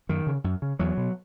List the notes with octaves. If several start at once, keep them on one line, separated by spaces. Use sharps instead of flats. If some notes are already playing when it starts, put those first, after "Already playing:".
F#2 D#3
C#3
F#2
C#3
E2 F#3
B2